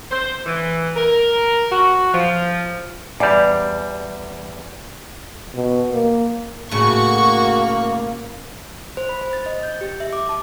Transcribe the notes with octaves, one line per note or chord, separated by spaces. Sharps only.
C5
E3
A#4
F#4
F3
E2 G3 D5
B2
A#3
A2 C#3 A#3 F#4 C#6
C5
B5
C5
A6
D#5
G6
G4
E5
D6
A5